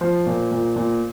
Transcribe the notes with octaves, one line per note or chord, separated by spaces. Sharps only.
F3 C5
A#2
A#2
A#2